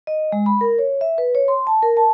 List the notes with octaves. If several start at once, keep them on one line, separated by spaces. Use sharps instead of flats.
D#5
G#3
B5
A#4
C#5
E5
B4
C#5
C6
A5
A#4
A5